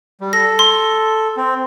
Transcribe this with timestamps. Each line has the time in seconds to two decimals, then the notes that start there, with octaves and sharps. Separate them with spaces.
0.21 G3
0.33 A4 A#6
0.59 C6
1.37 C4